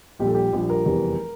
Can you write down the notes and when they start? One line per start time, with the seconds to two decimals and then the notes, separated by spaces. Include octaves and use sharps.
0.19 A#1 A#2 G3 G4
0.27 A4
0.35 G4
0.53 A#1 A#2 G3
0.70 A#4
0.86 F1 E2 E3 G3